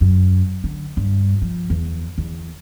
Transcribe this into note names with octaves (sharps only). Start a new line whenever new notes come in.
F#2
D3
G2
F3
E2
E2